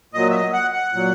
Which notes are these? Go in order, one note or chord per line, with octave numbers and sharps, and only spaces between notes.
A#2 F#3 D#5
E5
D#5
F#5
F#5
A#2 F#3